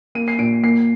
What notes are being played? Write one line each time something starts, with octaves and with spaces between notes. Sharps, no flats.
A#3 D#7
C7
A#2 D7
A#3 C7